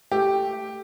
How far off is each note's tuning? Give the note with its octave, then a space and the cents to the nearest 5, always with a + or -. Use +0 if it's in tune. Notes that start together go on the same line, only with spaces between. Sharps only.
A3 +10 G4 +0